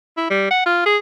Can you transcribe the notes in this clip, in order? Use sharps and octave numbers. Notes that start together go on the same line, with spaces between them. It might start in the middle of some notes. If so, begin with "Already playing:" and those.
E4
G3
F#5
F4
G#4